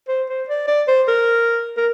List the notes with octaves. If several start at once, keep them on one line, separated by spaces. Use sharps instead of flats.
C5
C5
D5
D5
C5
A#4
A#4